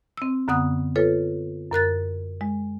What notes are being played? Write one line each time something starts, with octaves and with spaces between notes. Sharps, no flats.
C4 E6
F#2 D3 B3 F#5 D#6 F#6
F4 A4 B4 C#5
F#2 A#4 F#6 A6
G#3